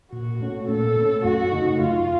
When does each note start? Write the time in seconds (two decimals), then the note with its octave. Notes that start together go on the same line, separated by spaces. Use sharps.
0.13 A#2 F#4
0.41 A3 C#4
0.68 A#2 A4
0.96 A3 C#4
1.24 F#2 F#4
1.52 C#3 A3 D#4
1.80 F#2 F4